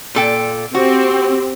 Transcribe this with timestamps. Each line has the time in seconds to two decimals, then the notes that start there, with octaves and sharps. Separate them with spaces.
0.15 A#2 A4 G5
0.75 C4 F#4 G4